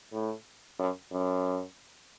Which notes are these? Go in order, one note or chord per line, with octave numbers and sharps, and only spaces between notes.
A2
F#2
F#2